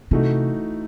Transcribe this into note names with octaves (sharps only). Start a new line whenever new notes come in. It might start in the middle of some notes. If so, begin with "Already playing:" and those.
C3 E3 A3 D#4 F#4